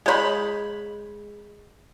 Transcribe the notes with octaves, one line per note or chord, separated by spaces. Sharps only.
G#3 C5 B5